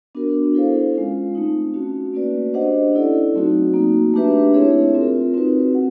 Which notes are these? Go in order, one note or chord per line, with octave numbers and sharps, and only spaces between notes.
B3 D4 F#4 A#4
E4 A4 C5 F5
G#3 C#4 F4
A3 C4 D#4
A3 C#4 F#4
A#3 C#4 F#4 B4 D5
D4 G4 C5 D#5 F#5
C#4 E4 A4 D5
F#3 A3 C4 D#4 F#4
A#3 D#4 F#4
A3 D4 G4 B4 E5
C4 E4 G#4 C#5
C4 F4 A#4
C4 D#4 F#4 B4
F#5